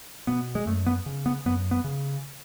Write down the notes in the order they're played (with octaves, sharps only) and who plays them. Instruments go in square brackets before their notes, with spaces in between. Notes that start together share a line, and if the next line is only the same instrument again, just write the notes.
[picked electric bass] B2 B3
G#3
F#2 A3
B3
C#3
B3
F#2 B3
B3
C#3